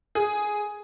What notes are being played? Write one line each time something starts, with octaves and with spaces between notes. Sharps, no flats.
G#4